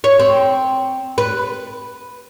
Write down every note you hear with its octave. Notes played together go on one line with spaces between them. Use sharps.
C#5
C4
B4